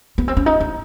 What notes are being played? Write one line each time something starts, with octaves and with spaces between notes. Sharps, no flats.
B3
C4
C#4
D#4
D#4